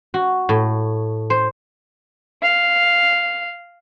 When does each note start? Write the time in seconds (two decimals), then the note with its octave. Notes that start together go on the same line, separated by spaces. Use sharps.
0.14 F#4
0.49 A2
1.30 C5
2.43 F5